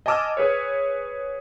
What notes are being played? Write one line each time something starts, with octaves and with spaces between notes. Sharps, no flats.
D#5 G#5 A5 D6 E6 F6
G#4 B4 C#5